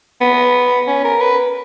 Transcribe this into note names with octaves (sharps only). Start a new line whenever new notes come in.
B3
C#4
A#4
B4